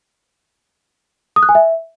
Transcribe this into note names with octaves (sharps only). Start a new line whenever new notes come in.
D#6
F#6
G#5
E5